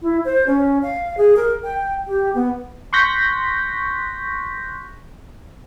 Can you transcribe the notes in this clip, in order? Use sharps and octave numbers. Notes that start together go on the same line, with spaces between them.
E4
C5
C#4
F5
G#4
A#4
G5
G4
B3
C6 C#6 F#6 G6 A#6 B6